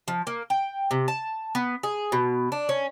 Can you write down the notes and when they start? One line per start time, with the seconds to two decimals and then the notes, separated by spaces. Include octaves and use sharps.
0.08 F3
0.27 A#3
0.50 G5
0.91 C3
1.08 A5
1.55 B3
1.83 G#4
2.12 B2
2.52 D4
2.69 C#4